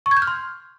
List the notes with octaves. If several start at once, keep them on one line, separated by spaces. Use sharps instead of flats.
C#6
G#6
G6
F6
C6